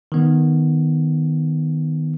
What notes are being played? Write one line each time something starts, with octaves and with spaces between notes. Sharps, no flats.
D#3 B3